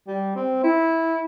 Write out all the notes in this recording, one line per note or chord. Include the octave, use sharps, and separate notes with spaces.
G3
C4
E4